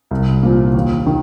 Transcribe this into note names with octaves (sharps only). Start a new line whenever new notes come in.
C2
A#2 F3
D#2
D#3